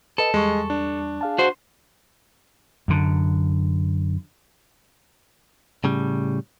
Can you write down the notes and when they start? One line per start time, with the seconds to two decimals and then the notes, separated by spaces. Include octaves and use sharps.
0.18 A4 B4 D#5
0.34 E2 G3 G#3 C#6
0.70 D4
1.21 G#4 F5 A5
1.38 F#4 C5
2.88 F#2 D3
5.84 A2 C#3 G3